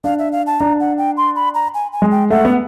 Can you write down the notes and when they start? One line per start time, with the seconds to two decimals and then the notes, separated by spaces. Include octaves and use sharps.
0.04 D4 F5
0.19 E5
0.32 F5
0.46 A5
0.60 D4 A#5
0.80 F#5
0.98 G5
1.17 C6
1.36 B5
1.54 A#5
1.74 G#5
1.92 G#5
2.02 G#3
2.11 G5
2.31 A3 F#5
2.45 B3